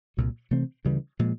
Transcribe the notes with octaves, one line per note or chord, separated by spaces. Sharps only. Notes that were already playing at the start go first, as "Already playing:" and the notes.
C2 A#2 F#3
C3 E3 A3 C4
D2 C#3 E3 G3
A#2 F3 G#3